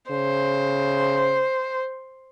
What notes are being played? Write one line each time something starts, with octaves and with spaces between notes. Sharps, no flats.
C#3 C5